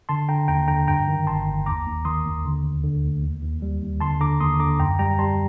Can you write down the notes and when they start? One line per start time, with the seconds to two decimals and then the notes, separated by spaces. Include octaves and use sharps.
0.09 D3 A5 C6
0.29 D3 G5 A#5
0.48 D#2 G5 A#5
0.68 D3 G5 A#5
0.88 G2 G5 A#5
1.08 D#3
1.27 G1 A5 C6
1.47 G1
1.66 D#2 A#5 D6
1.86 D#2
2.05 D#3 C6 D#6
2.25 D#2
2.45 D3
2.64 D2
2.84 D3
3.03 D2
3.22 D#2
3.42 D#2
3.62 G3
3.82 D#2
4.01 D3 A5 C6
4.20 D3 A#5 D6
4.40 D#2 C6 D#6
4.60 D3 A#5 D6
4.79 F#2 G5 A#5
4.99 G3 G5 A#5
5.19 G3 A5 C6